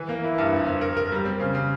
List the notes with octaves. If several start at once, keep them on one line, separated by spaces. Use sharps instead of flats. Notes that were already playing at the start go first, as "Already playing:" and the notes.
Already playing: E3
A#3
E4
G2
F2
F2
A#4
A#4
G3
C4
C#3
C#3